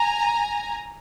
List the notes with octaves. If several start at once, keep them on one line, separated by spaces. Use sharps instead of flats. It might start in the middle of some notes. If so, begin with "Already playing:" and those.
Already playing: G#5 A#5